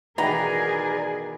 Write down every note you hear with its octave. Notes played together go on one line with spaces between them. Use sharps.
B2 D#3 E3 G#4 A#4 B4 D5 A#5